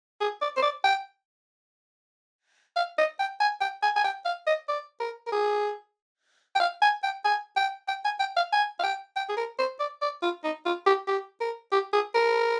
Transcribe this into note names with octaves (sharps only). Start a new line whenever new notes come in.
G#4
D5
C5
D5
G5
F5
D#5
G5
G#5
G5
G#5
G#5
G5
F5
D#5
D5
A#4
A#4
G#4
G5
F5
G#5
G5
G#5
G5
G5
G#5
G5
F5
G#5
F5
G5
G5
G#4
A#4
C5
D5
D5
F4
D#4
F4
G4
G4
A#4
G4
G#4
A#4